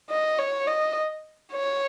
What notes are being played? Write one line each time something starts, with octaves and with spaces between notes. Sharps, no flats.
D#5
C#5
D#5
C#5